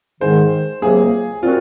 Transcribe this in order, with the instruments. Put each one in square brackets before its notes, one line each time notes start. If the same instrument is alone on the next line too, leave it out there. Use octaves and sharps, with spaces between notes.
[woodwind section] G#2 D#3 G#3 [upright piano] C5
[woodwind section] C#2 C3 F#3 A#3 [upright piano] G#4
[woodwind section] A#2 F3 C4 F#4 A#4 [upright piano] F4